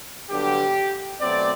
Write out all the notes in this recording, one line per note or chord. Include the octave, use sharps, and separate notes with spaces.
G2 D3 F#3 B3 G4
B2 F#3 A3 C4 D5